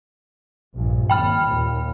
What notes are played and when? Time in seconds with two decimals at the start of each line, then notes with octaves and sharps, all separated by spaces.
0.75 A#1 G2
1.10 G#1 D#2 G5 B5 F6
1.46 D#2 A#2